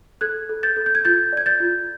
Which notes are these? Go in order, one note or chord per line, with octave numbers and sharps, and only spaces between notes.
A4 F#6 G#6
A4
G6 A6
A4
G6
G#6
F4 G6 A6
D5 G#6
G6 A6
F4